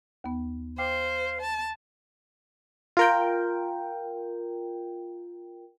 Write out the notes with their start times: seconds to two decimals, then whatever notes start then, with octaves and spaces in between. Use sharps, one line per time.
0.24 D#2 B3
0.78 C5 F5 G5 D6
1.41 A5
2.97 F4 A#4 G5